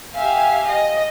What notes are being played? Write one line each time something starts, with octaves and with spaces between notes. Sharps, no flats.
G4 E5 F5 G#5
D#5